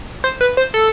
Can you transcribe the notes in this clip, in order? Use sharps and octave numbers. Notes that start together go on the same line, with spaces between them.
C5
B4
C5
A4